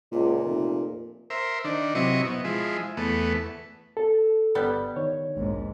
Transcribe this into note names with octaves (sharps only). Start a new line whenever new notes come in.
C#2 A#2
F1
A#4 C5 E5
D#3 D4
C3 F#3 E4 D#5 C#6
B2
F3 G#3 E4
E2 A3 B3
A4
G1 G3 B3
D#3 C#5
A#1 D#2 G#2